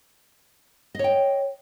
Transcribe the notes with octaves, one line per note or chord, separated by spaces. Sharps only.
C#5 D#5 G5